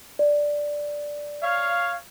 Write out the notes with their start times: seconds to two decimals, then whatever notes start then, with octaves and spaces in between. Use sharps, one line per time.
0.19 D5
1.43 C#5 F5